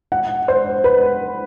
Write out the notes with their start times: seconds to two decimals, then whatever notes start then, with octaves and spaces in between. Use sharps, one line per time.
0.12 F#5
0.48 C5
0.84 B4